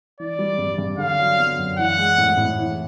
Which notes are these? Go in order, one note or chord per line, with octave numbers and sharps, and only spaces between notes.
E3 D5
G3
G2
G2
D3 F5
F#3
B3
F#2
E3 F#5
G#3
A2
A2
E3